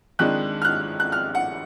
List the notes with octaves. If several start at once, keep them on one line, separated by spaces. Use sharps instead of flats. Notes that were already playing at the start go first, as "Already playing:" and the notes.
F2 D#3 G#3 D4 F#6
F6
F#6
F#6
F6
F#5